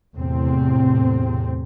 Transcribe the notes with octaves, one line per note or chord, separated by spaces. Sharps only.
E2 A2 C3 C4